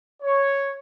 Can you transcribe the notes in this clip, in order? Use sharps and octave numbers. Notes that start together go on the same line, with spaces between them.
C#5